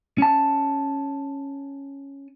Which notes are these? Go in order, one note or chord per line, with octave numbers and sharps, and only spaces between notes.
C#4 A5